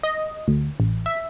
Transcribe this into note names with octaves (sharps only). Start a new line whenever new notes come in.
D#5
D2
A1
E5